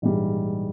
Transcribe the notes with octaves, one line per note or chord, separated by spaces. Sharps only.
A#1 G#2 E3 G3